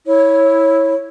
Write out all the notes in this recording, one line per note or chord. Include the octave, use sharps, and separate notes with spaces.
E4 C#5